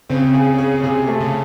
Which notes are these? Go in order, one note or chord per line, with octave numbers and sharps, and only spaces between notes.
C#3 C4
G#4
G#4
C3 G#4
A3
C#3